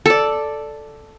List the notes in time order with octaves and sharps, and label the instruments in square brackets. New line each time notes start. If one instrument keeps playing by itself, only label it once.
[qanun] A4 D5